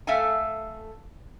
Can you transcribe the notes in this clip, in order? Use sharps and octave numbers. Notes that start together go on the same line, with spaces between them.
A3 A4 E5 F5 G#5